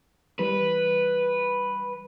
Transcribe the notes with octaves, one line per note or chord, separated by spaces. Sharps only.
E3 G3 B4